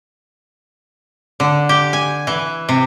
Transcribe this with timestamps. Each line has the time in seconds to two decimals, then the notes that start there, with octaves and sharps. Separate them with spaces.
1.40 D3
1.69 G4
1.93 G#5
2.27 E3
2.69 C3